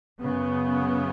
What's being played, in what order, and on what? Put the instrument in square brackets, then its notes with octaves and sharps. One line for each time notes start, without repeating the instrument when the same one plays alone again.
[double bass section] F#2 C#3 B3